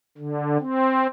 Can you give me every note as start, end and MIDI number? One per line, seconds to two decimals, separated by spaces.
0.18 0.58 50
0.60 1.07 60